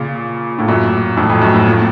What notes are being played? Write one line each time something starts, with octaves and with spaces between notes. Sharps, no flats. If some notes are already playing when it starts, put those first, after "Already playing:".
Already playing: A#2 C#3
A2
F#2 A#2
F2 A2
F2
F#2
A2
A#2